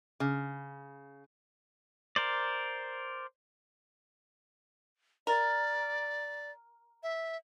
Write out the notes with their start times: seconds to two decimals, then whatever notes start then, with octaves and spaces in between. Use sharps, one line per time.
0.20 C#3
2.16 A#4 C5 D5
5.27 A#4 D5
7.03 E5